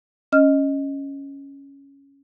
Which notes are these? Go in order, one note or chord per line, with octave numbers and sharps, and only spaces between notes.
C#4 D#5 F6